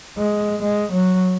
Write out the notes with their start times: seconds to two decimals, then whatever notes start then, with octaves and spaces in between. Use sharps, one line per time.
0.18 G#3
0.62 G#3
0.92 F#3